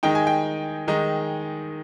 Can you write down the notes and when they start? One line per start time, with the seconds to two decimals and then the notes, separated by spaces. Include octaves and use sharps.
0.03 D#3 G#3 D#4 G5
0.15 G#5
0.27 G5
0.88 D#3 G#3 D#4